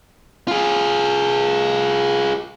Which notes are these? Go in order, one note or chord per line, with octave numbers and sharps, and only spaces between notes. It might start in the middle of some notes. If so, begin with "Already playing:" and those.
F4 G#4